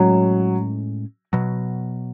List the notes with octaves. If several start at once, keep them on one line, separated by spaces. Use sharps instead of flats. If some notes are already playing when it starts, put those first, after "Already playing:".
Already playing: A2 F#3 G#3 C#4
B2 F#3